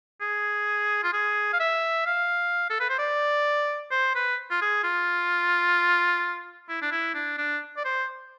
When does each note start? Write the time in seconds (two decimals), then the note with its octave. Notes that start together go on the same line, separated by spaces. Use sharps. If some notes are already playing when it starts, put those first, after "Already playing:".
0.21 G#4
1.03 F4
1.13 G#4
1.53 F5
1.60 E5
2.06 F5
2.70 A4
2.80 B4
2.89 C5
2.99 D5
3.91 C5
4.15 B4
4.51 F4
4.61 G#4
4.83 F4
6.69 E4
6.82 D4
6.91 E4
7.14 D4
7.38 D4
7.77 D5
7.84 C5